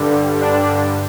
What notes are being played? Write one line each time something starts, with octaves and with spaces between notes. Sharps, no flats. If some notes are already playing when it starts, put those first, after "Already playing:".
Already playing: G2 D3 G3
D4